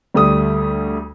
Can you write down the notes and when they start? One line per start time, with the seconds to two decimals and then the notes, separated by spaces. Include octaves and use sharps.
0.14 D2 G3 A3 D#6